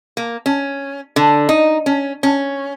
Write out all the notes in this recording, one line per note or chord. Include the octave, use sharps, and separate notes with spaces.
A#3
C#4
D3
D#4
C#4
C#4